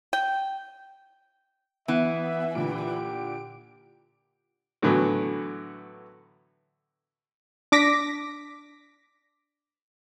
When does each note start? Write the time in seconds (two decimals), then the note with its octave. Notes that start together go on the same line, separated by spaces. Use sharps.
0.13 G5
1.88 E3 B3 E5
2.55 A#2 D3 G4 D7
4.82 A2 D3 E3 F#3 B3
7.72 D4 D6 A#6 B6